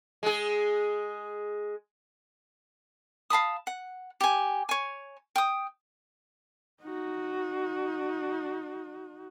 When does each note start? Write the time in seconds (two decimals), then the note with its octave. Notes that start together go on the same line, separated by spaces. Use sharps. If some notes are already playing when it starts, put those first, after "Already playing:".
0.23 G#3 G#4
3.30 F5 A5 B5 D#6
3.67 F#5
4.21 G4 G#5
4.69 C#5 G#5
5.36 G5 D#6
6.83 D#4 F#4